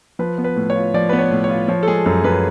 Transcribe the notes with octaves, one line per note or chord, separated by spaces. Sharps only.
F3 B4
B3
B4
A2
C#5
F4
F3 D5
B3 B4
C#5
A2
C#5
F4
F3 C#5
A4
G#3 G#4
F#2 A4
F#2 B4